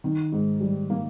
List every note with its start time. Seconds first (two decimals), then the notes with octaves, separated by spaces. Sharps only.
0.04 D#3
0.32 G#2
0.61 G3
0.90 A#3